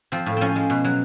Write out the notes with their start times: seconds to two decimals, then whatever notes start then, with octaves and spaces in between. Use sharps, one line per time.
0.12 F3 C4
0.26 A2
0.37 F3 C4 C#4
0.56 G#3
0.70 B2
0.85 F#3